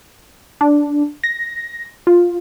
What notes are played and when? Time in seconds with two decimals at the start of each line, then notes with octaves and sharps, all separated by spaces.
0.61 D4
1.24 A#6
2.07 F4